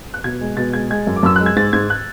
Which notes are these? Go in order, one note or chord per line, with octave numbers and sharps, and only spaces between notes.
F#6
B2 G#6
G#3
B2 A6
G#3 G#6
G#3 G#6
F#2
D6
F#2 E6
G#3 F#6
G#6
G#2 A6
G#2 G#6
F#6